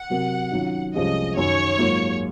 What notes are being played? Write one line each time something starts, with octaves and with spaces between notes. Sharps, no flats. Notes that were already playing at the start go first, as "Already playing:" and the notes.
Already playing: F#5
C3 F#3 C4 F#4 A#4
D#3 F#3 C#4 F4
C2 C3 F3 G#3 C#4 D#5
F#2 D#3 F#3 C#5
G#2 F#3 A#3 F4 A#4